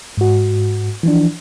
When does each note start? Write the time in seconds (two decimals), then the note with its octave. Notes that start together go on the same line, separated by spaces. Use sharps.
0.17 G#2 F#4
1.03 E3 F3 D4